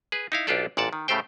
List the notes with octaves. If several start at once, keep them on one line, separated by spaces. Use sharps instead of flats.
G#4 B4
D#4 E4 F5
B1 D4 F4 G4 A4 D5
A1 A#2 D5 F#5 A5
D#3
A2 C#3 A3 G4 C5 G5